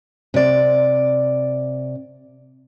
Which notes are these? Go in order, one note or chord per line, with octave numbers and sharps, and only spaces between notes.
C3 D5